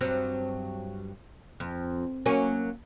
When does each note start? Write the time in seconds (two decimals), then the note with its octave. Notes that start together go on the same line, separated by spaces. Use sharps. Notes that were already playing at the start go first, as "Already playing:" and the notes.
0.01 G2 F#3 C4
1.60 F2
2.26 F#3 A#3 C#4